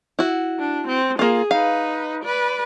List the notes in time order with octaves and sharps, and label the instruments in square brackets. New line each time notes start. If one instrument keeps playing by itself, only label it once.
[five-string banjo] E4 F#4
[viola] D4
C4
[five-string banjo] A#3 F4 [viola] G#4
[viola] D#4 B4 [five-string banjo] F5
[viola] B4 D5